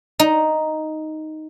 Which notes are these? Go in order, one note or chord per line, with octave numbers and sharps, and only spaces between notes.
D#4